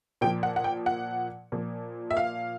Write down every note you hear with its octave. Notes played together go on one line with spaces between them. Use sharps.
A#2 F3 G5
F#5
F#5
G5
F#5
A#2 F3
E5
F5